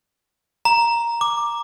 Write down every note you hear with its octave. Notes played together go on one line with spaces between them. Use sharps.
A#5
D6